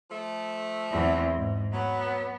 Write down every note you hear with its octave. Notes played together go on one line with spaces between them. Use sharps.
F3 A3
E2 C4
G#2
F#3 B3